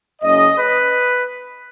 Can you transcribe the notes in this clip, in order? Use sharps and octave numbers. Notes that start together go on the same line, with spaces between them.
F#1 F#2 C#3 D#5
B4